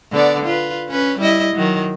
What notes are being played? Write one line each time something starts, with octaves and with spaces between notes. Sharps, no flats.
D3 B3 D5
F4 B4
C#4 B4
G3 E4 D#5
D#3 F#3